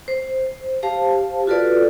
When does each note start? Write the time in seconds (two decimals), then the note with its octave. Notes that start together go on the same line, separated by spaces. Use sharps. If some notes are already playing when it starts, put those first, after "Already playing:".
0.08 C5
0.83 G4 C5 F5 A5
1.47 F4 F#4 A4 B4 D5